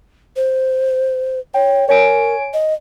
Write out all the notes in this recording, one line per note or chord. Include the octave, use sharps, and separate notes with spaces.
C5
C#5 G5
A#4 C#5 G#5 D7
D#5